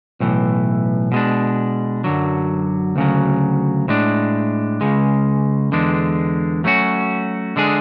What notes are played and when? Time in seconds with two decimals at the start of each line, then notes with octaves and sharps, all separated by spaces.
0.20 B1 A2 E3
1.12 B2 G#3 D4
2.04 F#2 D3 F#3
2.96 D2 C#3 F#3
3.88 A2 G#3 D4
4.81 C#2 C#3 G#3
5.72 E2 D3 G#3 D4
6.64 F#3 A3 C#4 F#4
7.56 D3 G#3 D4 G#4